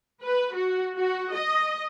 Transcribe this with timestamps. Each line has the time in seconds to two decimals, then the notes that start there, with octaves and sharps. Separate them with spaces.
0.23 B4
0.55 F#4
0.96 F#4
1.34 D#5